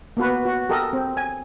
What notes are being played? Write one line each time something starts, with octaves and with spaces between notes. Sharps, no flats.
A#3 B3 F#4 B4
F#4
G4 A4 A#4 D#5
C4
G#5